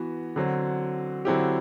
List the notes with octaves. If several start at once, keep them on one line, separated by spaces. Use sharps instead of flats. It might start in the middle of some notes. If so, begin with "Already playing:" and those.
Already playing: E3 B3 F#4
D3 F#3 C4
D3 F#3 C4 E4 G4